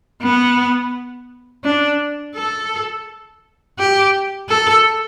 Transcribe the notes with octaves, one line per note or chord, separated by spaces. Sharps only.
B3
D4
A4
G4
A4